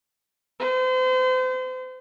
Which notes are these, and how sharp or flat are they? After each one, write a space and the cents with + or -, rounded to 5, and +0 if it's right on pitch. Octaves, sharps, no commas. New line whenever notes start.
C5 -35